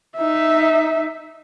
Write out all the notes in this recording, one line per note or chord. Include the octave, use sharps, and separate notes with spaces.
D#4 E5